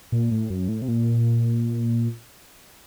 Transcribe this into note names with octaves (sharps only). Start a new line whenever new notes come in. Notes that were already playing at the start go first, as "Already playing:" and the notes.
A#2
A2
F#2
A2
C3
A#2